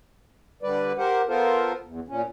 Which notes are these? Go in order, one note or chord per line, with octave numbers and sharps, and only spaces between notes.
D3 G3 B4 D5
G4 A#4 C5 F#5
B3 F4 A4 A#4 C5
E2
A#2 C#4